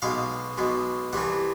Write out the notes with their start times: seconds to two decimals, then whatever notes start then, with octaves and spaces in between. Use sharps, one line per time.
0.02 B1 B2 G#3 F5
0.58 B1 B2 G#3
1.13 C2 C3 E3 A3 F#5